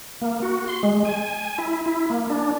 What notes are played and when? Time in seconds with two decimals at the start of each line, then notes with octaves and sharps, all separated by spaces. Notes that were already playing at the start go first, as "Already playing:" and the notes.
0.21 A#3
0.42 F#4
0.68 C6
0.83 G#3
1.05 G#5
1.58 E4
1.86 E4
2.10 A#3
2.30 D4